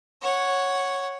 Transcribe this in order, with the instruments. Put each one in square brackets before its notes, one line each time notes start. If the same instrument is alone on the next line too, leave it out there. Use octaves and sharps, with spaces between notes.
[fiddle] C#5 F#5